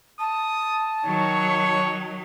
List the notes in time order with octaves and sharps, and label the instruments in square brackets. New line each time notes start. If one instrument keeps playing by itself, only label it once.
[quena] A5 [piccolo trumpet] D#6
[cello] D#3 F#3 [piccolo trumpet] C#5